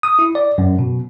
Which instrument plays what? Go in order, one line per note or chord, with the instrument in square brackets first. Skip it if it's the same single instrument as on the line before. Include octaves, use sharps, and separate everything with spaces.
[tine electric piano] D#6
E4
D5
F#2
B2